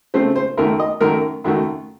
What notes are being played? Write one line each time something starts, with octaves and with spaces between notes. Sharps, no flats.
C#3 A3 C4 C5
C5
F#2 D#3 A3 A#4
D#5
F#2 D#3 A3 A#4
F#2 D#3 A3 F#4